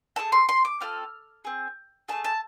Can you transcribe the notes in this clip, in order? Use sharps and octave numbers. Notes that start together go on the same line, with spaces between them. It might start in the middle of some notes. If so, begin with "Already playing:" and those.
A3 E4 G#4 A5
C6
C6
D6
C4 F4 A4 F6
C4 G#4
A3 D4 G#4 A5
A5